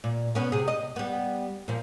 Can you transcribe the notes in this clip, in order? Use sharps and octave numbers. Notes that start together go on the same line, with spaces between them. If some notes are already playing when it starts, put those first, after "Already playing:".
A#2
B2 B3 C#4
C3 G#4
D#5
G3 B3
A#2 F3